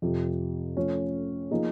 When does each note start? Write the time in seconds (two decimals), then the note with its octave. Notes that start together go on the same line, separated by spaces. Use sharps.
0.02 F2 C3 F3
0.77 F3 A3 C#4
1.51 F3 A#3 D#4 G#4